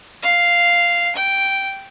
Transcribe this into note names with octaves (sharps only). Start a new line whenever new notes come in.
F5
G5